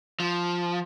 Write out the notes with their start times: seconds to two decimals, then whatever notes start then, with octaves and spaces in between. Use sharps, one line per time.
0.20 F3